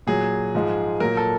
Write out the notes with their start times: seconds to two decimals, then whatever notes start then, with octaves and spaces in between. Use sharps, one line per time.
0.07 A#2 F#3 G#4
0.55 G#2 F3 G#3
1.00 A#2 F#3 A#4
1.17 A4